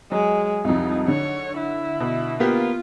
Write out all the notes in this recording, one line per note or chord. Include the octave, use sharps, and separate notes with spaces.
F#3 G#3
C2 F2 D#4
D3 C#5
E4
B2
A#3 B3 F4 G4